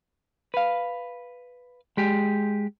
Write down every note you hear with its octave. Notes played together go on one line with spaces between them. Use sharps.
B4 F5
G#3 G4 G#4